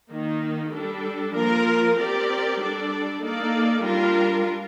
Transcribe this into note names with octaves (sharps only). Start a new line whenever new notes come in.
D#3 A#3 D#4
G3 D4 A4
F3 A#3 F4 A#4
C4 G4 A#4 D5
G3 D4 A4 D5
A#3 D#4 A4 D5
G3 D4 F4 A#4